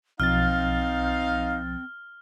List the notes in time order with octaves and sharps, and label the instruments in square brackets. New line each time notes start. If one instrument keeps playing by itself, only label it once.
[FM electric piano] B1 F3 A6 [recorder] C4 [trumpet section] D#4 F5 [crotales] F6